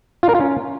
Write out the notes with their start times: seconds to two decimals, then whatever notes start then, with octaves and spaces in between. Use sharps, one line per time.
0.23 F4
0.29 A#4
0.35 F4
0.40 C#4